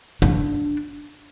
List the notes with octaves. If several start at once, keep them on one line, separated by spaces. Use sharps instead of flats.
D4